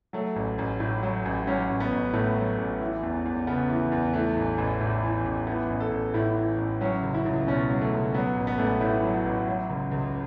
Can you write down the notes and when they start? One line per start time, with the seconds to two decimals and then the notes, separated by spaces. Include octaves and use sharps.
0.13 F#3 A3
0.36 A1
0.58 A1
0.80 A2
1.03 F#3
1.25 A1
1.47 F#3 C#4
1.69 A1
1.80 B3
1.92 A1
2.13 A2 A3
2.36 F#3
2.58 A1
2.81 E3
3.03 E2
3.25 E2
3.47 C#3 B3
3.70 E3
3.92 E2
4.13 E3 A3
4.36 A1
4.58 A1
4.80 A2
5.03 E3
5.25 A1
5.47 E3 B3
5.70 A1
5.80 A4
5.92 A1
6.14 A2 E4
6.37 E3
6.58 A1
6.81 F#3 C#4
7.03 C#2
7.14 E4
7.25 C#2
7.47 B2 C#4
7.70 F#3
7.81 A3
7.92 C#2
8.14 F#3 B3
8.37 A1
8.47 B3
8.58 A1 A3
8.67 B3
8.81 A2 E4
9.03 F#3
9.14 F#4
9.25 A1
9.48 F#3
9.70 C#2
9.92 C#2